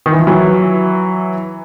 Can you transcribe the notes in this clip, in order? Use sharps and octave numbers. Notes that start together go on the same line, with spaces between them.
D#3
E3
F3
E3 F#3